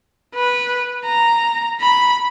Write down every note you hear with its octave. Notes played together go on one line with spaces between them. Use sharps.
B4
A#5
B5